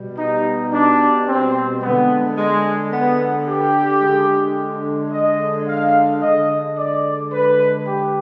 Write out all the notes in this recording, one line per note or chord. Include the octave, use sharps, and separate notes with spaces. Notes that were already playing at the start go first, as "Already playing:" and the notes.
Already playing: B2 G3
D#4
D4
C4
D3 G#3 B3
G#3
B3
G4
D3 G#3
D#5
F5
D3 G#3 D#5
D5
B4
G4